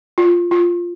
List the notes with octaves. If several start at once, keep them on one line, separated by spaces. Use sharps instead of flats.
F4
F4